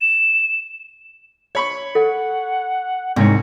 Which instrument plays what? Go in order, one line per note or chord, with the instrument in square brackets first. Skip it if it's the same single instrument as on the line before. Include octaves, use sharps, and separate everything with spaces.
[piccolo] E7
[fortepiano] C#5 B5 C#6
[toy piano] A4 [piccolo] F#5
[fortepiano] C2 C#5 [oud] G#2 [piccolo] A#6